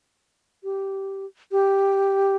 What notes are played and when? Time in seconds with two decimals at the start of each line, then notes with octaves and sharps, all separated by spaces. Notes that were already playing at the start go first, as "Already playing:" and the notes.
0.64 G4
1.52 G4